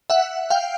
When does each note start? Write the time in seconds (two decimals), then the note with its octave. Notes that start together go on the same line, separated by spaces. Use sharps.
0.10 E5 F#5
0.50 F5 G5